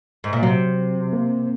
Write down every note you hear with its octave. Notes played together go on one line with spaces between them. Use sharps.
G#2
A#2
C3 F#3
A#3